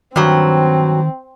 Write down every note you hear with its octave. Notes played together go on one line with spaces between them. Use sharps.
G2 D#3 F#3 C4